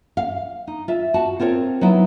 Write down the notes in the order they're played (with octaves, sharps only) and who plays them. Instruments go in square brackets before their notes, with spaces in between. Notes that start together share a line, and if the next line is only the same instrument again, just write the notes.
[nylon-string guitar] F5
D#4
F4 E5
F#4 A5
C4 F4 A#4 C#5
F#3 B3 D#4 E4